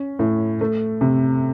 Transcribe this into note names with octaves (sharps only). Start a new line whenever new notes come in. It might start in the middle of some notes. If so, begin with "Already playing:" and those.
Already playing: C#4
A2
A3
C3